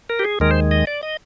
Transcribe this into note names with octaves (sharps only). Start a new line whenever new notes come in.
A#4
G4
G#4
D#2 D#3 G#3 A#4
C5
D#5
D5
D#5